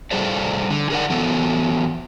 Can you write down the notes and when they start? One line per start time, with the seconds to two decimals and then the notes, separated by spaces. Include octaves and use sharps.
0.11 G3 G#4 A4 C5 D5
0.70 D3
0.90 G#4 A#4 D5 F#5
1.10 E3 F#3 B3 A4